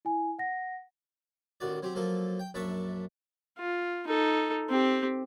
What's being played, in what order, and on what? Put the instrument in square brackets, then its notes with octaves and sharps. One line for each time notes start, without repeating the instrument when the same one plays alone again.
[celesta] E4 G#5
F#5 A#6
[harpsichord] A1 D#3 F#4 D5
F#3 C4 G4
F3 F#3 A#3 A4
G5
A#1 F#2 D4 E5 A5 C#6
[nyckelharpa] F4
D#4 A4
C4 G4